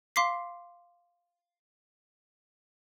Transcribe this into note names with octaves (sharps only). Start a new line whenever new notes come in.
F5 C6 D6 B6 C7